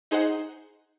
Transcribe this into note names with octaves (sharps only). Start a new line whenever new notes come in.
D#4 G#4 C5 D#5 F#5